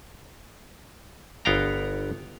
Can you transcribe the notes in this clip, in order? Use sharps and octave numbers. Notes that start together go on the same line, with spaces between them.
G1 B3 C#5 F5 G5 A#5